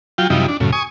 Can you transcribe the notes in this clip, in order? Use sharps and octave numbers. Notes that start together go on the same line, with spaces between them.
F#3 F4 G5
F#2 C3 F3 G3 D#4 E4
D4
F#2 A2 C#3
G#5 C#6 D#6